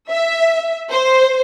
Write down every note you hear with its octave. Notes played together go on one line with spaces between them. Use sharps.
E5
C5